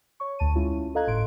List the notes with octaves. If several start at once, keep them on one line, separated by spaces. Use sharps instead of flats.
C#5 C#6
D2 A5 D#7
G#3 C#4 E4 F4
A4 D#5 F5 A#5 F#6 G#6
G1 A2 C6 D7